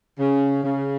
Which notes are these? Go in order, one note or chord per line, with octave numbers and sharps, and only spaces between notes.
C#3
C#3